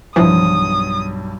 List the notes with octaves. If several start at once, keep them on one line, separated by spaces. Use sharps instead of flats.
B1 G2 E3 F3 D#6